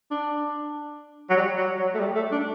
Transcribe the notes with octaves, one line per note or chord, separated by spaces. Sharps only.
D4
F#3
G3
F#3
F#3
A3
G3
A3
D4